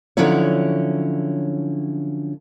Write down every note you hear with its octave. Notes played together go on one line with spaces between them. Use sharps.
D3 F3 F#3 C#4 E4 C#5